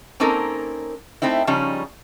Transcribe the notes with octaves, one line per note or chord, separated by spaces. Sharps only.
A#3 C4 C#4 D#4 A4 A#4
A3 C4 D#4 E4
C#3 F3 G3 C#4 D#4